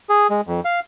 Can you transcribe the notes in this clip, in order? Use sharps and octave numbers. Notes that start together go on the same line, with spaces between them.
G#4
G#3
F2
F5